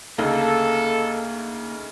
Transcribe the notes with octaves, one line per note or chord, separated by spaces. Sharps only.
D2 C#3 A#3 D#4 A4